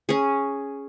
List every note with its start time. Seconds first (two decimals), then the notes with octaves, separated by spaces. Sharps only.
0.09 C#4 G#4